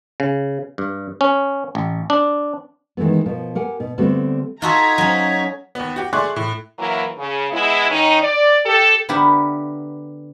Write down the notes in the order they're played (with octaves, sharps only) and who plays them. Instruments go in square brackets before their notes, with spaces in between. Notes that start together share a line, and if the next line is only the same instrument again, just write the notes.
[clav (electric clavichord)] C#3
G2
C#4
A1
D4
[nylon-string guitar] D#3 E3 G#3 A3 B3
B2 F3 A#4
G4 A#4 F#5 G#5
B2
D3 G3 A3 B3 C4 F#4
[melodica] D#4 [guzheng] F4 F#4 A4 [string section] A#5 G#6 B6
[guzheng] F#3 C#4
[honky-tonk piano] D#2 B3
F#4 G4
A3 G#4 D5 C6 C#6 F#6
A2
[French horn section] E3 F#3 A#3 E4 A#4
C#3
G#3 B3 E4
D#3 C#4 D#4
D5
G4 A4
[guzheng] D3 B3 E4 G4 A#4 B4